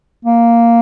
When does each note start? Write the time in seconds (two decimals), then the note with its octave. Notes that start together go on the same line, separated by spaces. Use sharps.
0.25 A#3